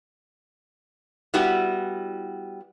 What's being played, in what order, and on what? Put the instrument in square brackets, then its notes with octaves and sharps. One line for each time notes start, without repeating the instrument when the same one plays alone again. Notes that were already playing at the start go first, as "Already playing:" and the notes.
[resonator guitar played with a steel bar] G3 B3 E4 F#4 G4